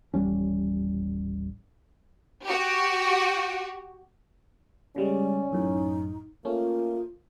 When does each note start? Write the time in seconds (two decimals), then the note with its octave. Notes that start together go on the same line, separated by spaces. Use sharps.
0.14 D#1 A1 G3 C#4
2.44 F#4 G4
4.96 C#3 G3 G#3 C#4 D5
5.51 A1 F#2 A2 D#4
6.45 A3 A#3 C#4 F4